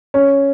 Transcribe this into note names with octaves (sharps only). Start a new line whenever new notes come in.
C#4